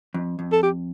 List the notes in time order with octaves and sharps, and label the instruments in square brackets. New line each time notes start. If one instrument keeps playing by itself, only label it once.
[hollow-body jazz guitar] F2
F2
[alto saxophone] A4
G4